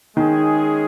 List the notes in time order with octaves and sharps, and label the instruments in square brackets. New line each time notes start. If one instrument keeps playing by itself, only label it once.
[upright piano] D#3 [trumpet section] G#3 C#4 G#4